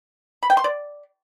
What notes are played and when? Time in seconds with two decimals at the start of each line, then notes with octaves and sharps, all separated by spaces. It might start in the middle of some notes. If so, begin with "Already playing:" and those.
0.43 B5
0.50 G5
0.57 C6
0.64 D5